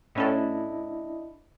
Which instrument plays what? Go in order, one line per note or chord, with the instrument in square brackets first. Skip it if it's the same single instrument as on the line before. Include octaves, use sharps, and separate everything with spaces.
[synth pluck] A2 C#4 A4 [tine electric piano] D4 E4 D#5